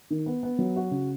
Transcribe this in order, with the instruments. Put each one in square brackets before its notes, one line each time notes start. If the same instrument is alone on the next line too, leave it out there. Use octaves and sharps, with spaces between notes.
[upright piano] D#3
B3
B3
F#3
F#4
C#3